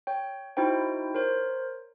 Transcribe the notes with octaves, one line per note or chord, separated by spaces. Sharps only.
C#5 G5
D#4 E4 F#4 C5 G5
A#4 C5 C#5